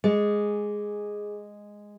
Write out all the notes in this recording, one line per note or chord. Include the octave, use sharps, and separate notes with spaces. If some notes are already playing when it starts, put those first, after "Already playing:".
G#3 G#4